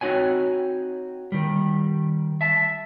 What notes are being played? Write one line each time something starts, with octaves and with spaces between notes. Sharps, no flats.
C4 D#4 F#4 C#5 G#5
D#3 G3
E5 A5